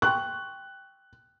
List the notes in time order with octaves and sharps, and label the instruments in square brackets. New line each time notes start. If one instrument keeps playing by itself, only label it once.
[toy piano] G5 C6 C#6 [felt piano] F#6